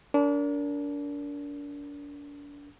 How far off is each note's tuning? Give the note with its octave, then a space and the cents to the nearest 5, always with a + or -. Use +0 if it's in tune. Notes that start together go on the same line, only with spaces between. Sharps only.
D4 -35 A#4 +0